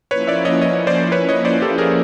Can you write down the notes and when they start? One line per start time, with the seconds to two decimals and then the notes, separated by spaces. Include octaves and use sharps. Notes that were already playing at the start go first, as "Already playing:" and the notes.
0.11 F3 A#3 C#4 E4 B4 C#5
0.27 D5 E5
0.45 C#5 D#5
0.61 C#5 D#5
0.87 C5 D5
1.12 B4 C#5
1.29 C#5 D#5
1.45 C5 D5
1.62 G4 A4
1.78 G#4 A#4